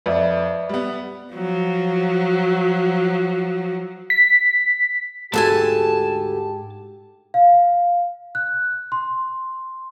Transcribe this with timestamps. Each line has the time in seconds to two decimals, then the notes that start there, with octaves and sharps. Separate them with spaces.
0.06 F2 B4 D5 E5
0.69 G3 B3
1.33 F3 F#3
4.10 B6
5.34 D2 G#2 G#3 G4 A4 G#5 A5
7.34 F5
8.35 F#6
8.92 C6